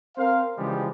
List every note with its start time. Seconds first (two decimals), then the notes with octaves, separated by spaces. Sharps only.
0.16 C4 A#4 C5 F5
0.57 C#3 E3 F3 G3 G#3